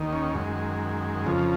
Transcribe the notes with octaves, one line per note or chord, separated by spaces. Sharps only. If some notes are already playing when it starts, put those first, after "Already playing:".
Already playing: D#2 D#3
C#4
F#2 D#3 G#3
F2 C#3 F3